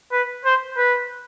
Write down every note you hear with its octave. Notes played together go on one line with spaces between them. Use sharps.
B4
C5
B4